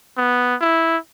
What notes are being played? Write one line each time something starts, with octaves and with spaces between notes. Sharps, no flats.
B3
E4